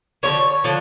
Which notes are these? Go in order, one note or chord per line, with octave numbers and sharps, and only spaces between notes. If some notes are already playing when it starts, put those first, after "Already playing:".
D3 F3 A#3 C#5
D3 F3